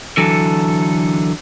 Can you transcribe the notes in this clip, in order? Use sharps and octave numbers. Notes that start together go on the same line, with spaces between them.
D3 E3 F#3 A4